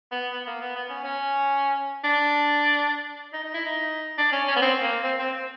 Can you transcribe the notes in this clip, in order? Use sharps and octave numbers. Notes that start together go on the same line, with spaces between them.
B3
B3
A#3
B3
B3
C#4
C#4
D4
D#4
D#4
E4
D#4
D4
C#4
C#4
B3
C4
A#3
C4
C4
C4